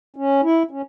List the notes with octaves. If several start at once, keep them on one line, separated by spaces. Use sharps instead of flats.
C#4
E4
C#4